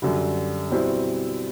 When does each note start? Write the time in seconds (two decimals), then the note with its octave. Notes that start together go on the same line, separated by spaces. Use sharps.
0.02 F#2 D3 G3
0.70 B2 G3 C4 E4